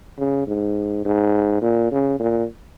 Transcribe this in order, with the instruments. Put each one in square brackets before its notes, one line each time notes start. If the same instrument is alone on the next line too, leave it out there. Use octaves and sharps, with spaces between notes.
[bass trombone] C#3
G#2
G#2
A#2
C#3
A#2